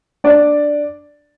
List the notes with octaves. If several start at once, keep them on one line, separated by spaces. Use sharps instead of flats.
D4 D5